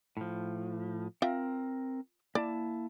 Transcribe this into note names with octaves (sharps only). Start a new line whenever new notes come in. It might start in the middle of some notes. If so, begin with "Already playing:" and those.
A2 F3
C4 F4 A#4 E5 G5
A#3 E4 D5 A5